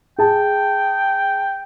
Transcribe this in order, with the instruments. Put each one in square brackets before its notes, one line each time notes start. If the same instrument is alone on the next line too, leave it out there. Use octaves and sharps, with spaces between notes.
[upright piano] G#4 A5 [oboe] G5